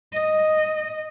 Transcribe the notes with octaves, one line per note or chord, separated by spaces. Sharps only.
D#5